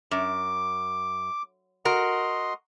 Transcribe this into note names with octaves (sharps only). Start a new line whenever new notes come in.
F#2 D6
F#4 A#4 D#5 C6